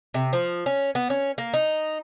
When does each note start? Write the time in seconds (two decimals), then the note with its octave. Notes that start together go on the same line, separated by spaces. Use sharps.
0.14 C3
0.33 F3
0.66 C#4
0.95 B3
1.10 C#4
1.38 A#3
1.54 D#4